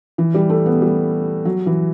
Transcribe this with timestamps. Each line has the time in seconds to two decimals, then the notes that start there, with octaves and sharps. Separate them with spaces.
0.18 E3
0.34 G3
0.49 A3
0.66 B3
0.82 G3
1.45 F#3
1.66 E3